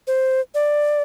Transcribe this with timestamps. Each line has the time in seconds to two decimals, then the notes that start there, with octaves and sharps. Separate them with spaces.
0.07 C5
0.55 D5